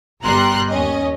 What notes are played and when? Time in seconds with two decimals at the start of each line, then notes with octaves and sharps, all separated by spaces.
0.23 G1 G3 A#5 C6 F#6
0.69 D#2 C#4 D#5